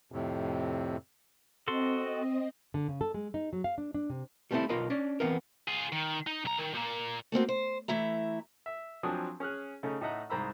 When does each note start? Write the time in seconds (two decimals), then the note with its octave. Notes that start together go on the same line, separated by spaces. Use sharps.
0.12 F2 A2 C3
1.68 C4 F#4 A4 D#5 C6
2.74 D3
2.88 C#3
3.01 A4
3.14 G#3
3.34 D#4
3.53 F#3
3.64 F5
3.78 D4
3.94 D4
4.09 C3
4.51 G3 A3 B3 C4 E4 A4
4.69 B1 F4 A#4 D#5 B5
4.90 C#4 D4 D5
5.20 E3 B3 C4 A#4
5.68 F4 G#4
5.92 D#3
6.27 D#4
6.45 B1 A#5
6.58 D#3
6.74 A#2 A#3
7.32 A3 A#3 C4 F#4
7.49 C5
7.88 E3 A3 E4 E5 A#5
8.66 E5
9.03 F3 F#3 C4 D4 G#5 D#6
9.40 C#4 G#4 F6 F#6
9.83 C#3 A3 C#4 D#4
10.01 A2 D#4 D#5 E5 F#5 A#5
10.30 C2 G#2 C5 A#5 B5 E6